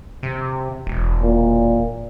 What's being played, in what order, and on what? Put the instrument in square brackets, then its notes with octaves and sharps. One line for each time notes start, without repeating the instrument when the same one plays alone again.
[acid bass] C3
E1
[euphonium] A#2